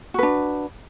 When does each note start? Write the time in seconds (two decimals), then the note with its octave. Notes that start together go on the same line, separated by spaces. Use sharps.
0.14 F#4
0.19 B4
0.23 D4